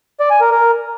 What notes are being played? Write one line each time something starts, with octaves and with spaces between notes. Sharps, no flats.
D5
G#5
A#4
A#4